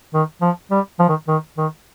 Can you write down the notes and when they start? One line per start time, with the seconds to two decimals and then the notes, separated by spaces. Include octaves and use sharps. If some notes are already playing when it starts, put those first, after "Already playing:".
0.14 D#3
0.41 F3
0.71 G3
0.99 F3
1.09 D#3
1.28 D#3
1.58 D#3